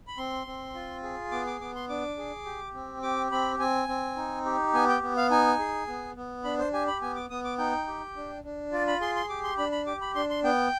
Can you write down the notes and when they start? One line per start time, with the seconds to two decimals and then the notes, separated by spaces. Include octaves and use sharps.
0.07 B5
0.18 C4 C6
0.47 C4
0.75 F4
1.03 G#4
1.31 B3 D6
1.47 D6
1.61 B3 D6
1.75 C6
1.89 D4 D6
2.18 G#4
2.45 G4
2.74 C4
3.02 G4 D6
3.32 C4 B5
3.59 C4 G#5
3.88 C4
4.16 D#4
4.45 G4
4.74 B3 G#5
4.89 G5
5.02 B3
5.17 F5
5.31 D#4 G#5
5.59 G#4
5.87 B3
6.17 B3
6.44 D4 B5
6.58 C5
6.73 G4 G#5
6.88 B5
7.02 B3 G#5
7.16 D6
7.30 B3 D#6
7.44 D6
7.58 D#4 G5
7.88 G4
8.16 D4
8.44 D4
8.72 F4 D5
8.87 B5
9.01 G#4 C6
9.16 C6
9.29 G4 D6
9.44 C6
9.58 D4 B5
9.72 B5
9.86 G4 D6
10.01 B5
10.15 D4 C6
10.30 C6
10.44 B3 G5